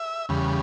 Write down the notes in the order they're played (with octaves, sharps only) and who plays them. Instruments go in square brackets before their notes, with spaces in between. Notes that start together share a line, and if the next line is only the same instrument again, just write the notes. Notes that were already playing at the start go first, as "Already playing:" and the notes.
Already playing: [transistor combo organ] E5
E2 C#3 G3